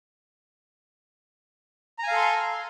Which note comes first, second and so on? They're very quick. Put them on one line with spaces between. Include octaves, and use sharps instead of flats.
A#5 G#5 F5 A4 C6